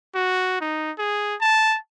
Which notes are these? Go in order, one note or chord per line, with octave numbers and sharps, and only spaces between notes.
F#4
D#4
G#4
A5